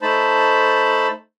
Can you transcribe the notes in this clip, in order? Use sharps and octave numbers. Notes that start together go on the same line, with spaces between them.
A3 D#4 C5 A5 B5